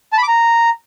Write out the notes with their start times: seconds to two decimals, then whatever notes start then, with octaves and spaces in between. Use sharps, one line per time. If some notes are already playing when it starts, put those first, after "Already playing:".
0.13 A5
0.18 B5
0.23 D6
0.28 A#5